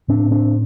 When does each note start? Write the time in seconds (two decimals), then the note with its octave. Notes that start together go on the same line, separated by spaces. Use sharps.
0.08 A2 C4 D4
0.31 C4 D4